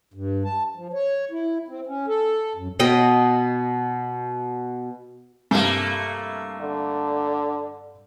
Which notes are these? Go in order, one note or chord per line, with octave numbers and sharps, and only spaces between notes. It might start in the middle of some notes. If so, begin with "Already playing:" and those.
G2
A5
F3
C#5
E4
C4
C#4
A4
F#2
B2 D#5 G5
G2 C3 G3 A3 A#3
D3